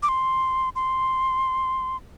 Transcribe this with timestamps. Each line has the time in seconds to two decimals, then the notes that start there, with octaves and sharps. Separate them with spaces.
0.03 D6
0.09 C6
0.76 C6